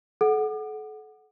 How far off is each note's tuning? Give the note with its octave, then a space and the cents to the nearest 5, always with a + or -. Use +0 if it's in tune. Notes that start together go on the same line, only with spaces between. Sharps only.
A4 -40 F#5 +0